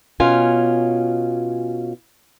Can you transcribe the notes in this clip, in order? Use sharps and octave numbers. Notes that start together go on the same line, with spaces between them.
B2 C#4 F4 G#5